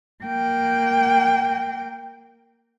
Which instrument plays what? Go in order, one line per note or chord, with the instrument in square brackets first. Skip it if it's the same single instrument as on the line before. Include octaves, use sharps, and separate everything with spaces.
[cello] A#3 G5